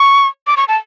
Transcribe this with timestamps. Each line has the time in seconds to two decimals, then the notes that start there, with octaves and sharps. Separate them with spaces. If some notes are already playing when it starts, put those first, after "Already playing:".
Already playing: C#6
0.47 D6
0.57 C#6
0.68 A5